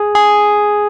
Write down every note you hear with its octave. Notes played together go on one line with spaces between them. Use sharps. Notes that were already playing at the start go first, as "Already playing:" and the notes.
Already playing: G#4
G#4